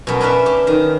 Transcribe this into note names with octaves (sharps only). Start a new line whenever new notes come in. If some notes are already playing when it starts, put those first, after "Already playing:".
F#2 B2
C#4 D4 B4 E5 F5
G4
D#3